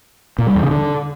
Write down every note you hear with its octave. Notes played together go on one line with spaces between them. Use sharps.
A#2
G3
E2
C#3
D3